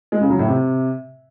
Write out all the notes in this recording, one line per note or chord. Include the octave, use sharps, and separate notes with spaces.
G#3
C#3
F#3
A2
C3